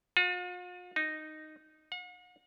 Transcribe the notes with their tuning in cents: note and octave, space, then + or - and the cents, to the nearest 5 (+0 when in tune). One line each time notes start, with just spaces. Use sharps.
F4 +45
D#4 -5
F#5 -45